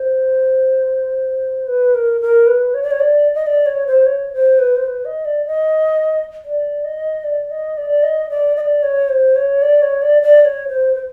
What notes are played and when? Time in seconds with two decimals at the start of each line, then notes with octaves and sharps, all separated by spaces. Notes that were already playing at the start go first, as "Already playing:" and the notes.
Already playing: C5
1.67 B4
1.95 A#4
2.21 A#4
2.47 B4
2.74 C#5
2.83 D5
2.91 C#5
3.00 D5
3.35 D#5
3.47 D5
3.66 C#5
3.87 C5
4.06 C#5
4.33 C5
4.59 B4
4.76 C5
4.86 B4
5.05 D#5
5.25 D5
5.46 D#5
6.45 D5
6.84 D#5
7.24 D5
7.51 D#5
7.78 D5
8.03 D#5
8.30 D5
8.57 D#5
8.61 D5
8.83 C#5
9.09 C5
9.36 C#5
9.62 D5
9.82 C#5
10.02 D5
10.23 D5
10.42 D5
10.45 C#5
10.68 C5
10.95 C5